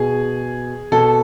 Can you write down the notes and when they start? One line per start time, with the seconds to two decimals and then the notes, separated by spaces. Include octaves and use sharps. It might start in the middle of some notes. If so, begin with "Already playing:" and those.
Already playing: B2 G#4
0.92 B2 A4